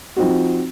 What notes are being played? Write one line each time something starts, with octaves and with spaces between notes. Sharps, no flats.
F3 C4 D#4 F#4